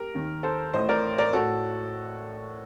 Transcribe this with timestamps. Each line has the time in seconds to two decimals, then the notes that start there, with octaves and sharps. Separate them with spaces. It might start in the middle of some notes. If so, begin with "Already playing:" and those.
Already playing: G4 A#4
0.14 D#2 D#3
0.43 A4 C5
0.74 A1 A2 C5 D#5
0.89 A#4 D5
1.18 A#4 D5
1.33 A2 F#4 A4